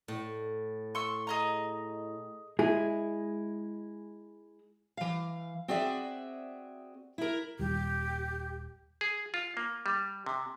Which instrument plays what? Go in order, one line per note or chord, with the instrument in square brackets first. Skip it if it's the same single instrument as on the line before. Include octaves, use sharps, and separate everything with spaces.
[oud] A2
[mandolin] C6 C#6 E6
G#4 D#5 A#5
[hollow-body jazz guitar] G#3 E4 G#4
[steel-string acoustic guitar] E3 F5
C4 F#4 G#4 D5 E5
E4 A#4
[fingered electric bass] D#1 G3 [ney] G4
[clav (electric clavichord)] G#4
F4
A#3
G3
C3